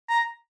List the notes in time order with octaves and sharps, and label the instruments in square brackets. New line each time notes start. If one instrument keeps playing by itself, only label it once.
[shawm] A#5